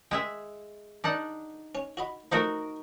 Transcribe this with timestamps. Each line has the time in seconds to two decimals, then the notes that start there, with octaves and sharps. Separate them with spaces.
0.11 G#3 G#4 E5 G5
1.04 D4 D#4 F#5
1.75 C#4
1.97 F#4 D#5 B5
2.32 F3 A3 D#4 F#4 A#4